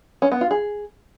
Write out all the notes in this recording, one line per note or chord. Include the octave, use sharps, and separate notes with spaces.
C#4
B3
F4
G#4